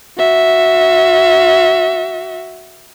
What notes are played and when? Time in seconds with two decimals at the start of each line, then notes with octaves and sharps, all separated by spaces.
0.18 F#4 E5